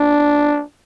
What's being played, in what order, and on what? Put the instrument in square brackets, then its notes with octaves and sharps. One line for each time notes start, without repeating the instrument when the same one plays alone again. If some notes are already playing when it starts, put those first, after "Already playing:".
Already playing: [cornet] D4